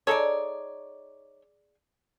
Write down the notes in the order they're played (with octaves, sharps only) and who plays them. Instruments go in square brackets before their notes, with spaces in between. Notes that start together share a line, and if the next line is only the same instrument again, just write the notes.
[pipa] D#4 A4 C#5 [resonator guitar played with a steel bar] G#4 D5